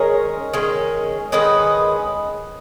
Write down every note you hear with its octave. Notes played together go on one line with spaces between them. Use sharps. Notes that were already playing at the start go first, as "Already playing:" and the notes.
Already playing: D#3 G#3 C#4 A#4 C#5
D#3 G#3 C#4
D#3 G#3 C#4 B4 D#5